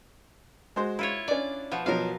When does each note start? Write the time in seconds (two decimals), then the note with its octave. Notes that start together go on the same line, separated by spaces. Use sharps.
0.76 G#3 F#4 C5
0.99 E4 F4 C#5
1.28 C#4 D4 D5
1.71 B2 F3
1.86 B2 F3 F#3 A#4 F5